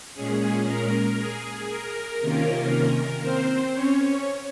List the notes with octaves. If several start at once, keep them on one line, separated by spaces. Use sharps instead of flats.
A#2 G#3 C#4 G#4
A#4
G#4
A#4
C3 D#3 A#3 C#4 F4
C4 C5
C#4 C#5